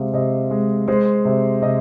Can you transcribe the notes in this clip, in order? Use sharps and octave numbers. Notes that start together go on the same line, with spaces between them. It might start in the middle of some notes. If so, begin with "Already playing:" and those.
Already playing: C3 G#3 F5
C3 D#5
G#3
G#3 C5
C3
C3 D#5